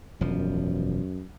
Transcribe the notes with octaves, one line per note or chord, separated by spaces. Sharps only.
E1 F#2 F3